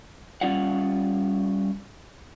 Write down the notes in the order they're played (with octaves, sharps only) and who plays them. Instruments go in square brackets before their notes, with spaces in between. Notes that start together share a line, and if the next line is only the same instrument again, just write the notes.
[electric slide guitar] G3 C#4 F4 D5 F5 F#5